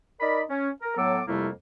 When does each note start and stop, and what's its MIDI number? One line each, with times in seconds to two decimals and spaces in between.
0.20 0.41 63
0.20 0.41 70
0.20 0.41 74
0.20 0.41 83
0.49 0.69 61
0.82 0.95 70
0.97 1.20 45
0.97 1.20 54
0.97 1.20 59
0.97 1.20 69
0.97 1.20 86
0.97 1.20 88
1.27 1.48 41
1.27 1.48 48
1.27 1.48 55
1.27 1.48 57
1.27 1.48 58
1.27 1.48 64